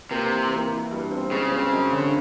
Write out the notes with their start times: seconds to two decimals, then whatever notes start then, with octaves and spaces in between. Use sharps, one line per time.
0.11 C3 A#3
0.31 E3
0.52 A#3
0.72 E3
0.91 G2
1.11 C4
1.31 C#3 G#3
1.52 C4
1.72 F#2
1.92 D3